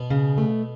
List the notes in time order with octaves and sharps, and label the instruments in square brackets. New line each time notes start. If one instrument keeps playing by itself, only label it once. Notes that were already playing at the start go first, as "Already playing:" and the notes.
Already playing: [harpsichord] B2 B3
[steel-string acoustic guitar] C#3
A3